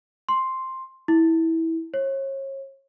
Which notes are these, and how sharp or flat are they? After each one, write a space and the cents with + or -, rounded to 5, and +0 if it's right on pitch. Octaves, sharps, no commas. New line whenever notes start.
C6 +5
E4 -20
C#5 -35